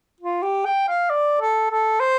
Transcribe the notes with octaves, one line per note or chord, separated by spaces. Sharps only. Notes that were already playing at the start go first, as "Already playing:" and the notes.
F4
G4
G5
F5
D5
A4
A4
C5